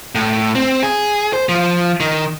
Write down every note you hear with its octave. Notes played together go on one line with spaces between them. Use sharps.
A2
C4
G#4
C5
F3
D#3